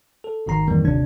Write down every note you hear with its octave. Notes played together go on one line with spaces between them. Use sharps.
A4
G#1 G#2 D#3 A#5 C7
F2 G#2 D#3 E3 G3 A#3
G1 D#2 C3 D4 G#6